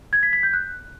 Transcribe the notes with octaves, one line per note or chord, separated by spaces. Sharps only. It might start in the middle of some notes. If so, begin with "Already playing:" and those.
G#6
B6
B6
G6
F#6